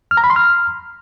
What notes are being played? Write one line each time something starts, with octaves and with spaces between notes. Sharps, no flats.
F6
A#5
B5
C6
F6